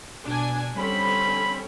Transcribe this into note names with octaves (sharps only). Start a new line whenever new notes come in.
B2 D4 G#5
D3 G3 C4 C#4 B5